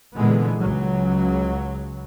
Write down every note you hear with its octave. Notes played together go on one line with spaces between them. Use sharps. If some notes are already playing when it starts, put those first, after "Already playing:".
A#2 D3 E3 G#3 B3
C#2 C#3 F#3